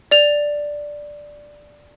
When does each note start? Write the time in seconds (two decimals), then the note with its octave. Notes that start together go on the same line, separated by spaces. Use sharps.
0.11 D5 F7